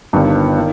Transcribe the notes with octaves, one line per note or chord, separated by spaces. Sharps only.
G1 G2 D#3
D#3